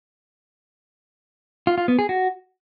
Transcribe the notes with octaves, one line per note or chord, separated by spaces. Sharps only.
F4
F4
B3
G#4
F#4